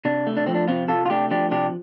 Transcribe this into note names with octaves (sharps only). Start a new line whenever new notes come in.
C3 D4
A3
D4
F3 C4
D4
C3 C4 F4
C3 F4 A4
F4
A3 D4 G4
F3 D4 G4
C3 D4 G4